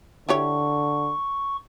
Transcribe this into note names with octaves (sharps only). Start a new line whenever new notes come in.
D3 E4 G4 C#5 C#6